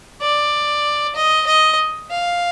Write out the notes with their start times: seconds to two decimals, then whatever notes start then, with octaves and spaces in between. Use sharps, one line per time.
0.21 D5
1.16 D#5
1.47 D#5
2.11 F5